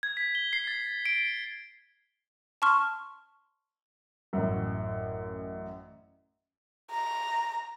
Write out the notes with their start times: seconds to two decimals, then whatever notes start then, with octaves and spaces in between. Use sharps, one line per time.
0.03 G#6
0.17 B6
0.35 G7
0.53 C7
0.67 A6
1.06 D7
2.62 A5 C6 C#6 F6
4.33 A1 F#2
6.91 A#5